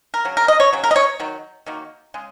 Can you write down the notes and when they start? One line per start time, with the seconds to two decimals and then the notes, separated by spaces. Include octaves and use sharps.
0.14 A#4
0.25 C#3 F#3
0.37 A#4
0.48 D#5
0.60 C#5
0.73 C#3 F#3
0.84 A#4
0.91 D#5
0.96 C#5
1.20 D#3 F#3
1.66 D#3 F#3 A#3
2.14 C#3 G#3